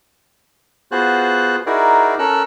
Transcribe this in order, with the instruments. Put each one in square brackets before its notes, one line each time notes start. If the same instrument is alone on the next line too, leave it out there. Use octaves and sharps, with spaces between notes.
[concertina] B3 F4 F#4 G#4 C5 F#6
D#4 E4 F#4 G#4 A#4 D5
C#4 A4 A#4 E6 F#6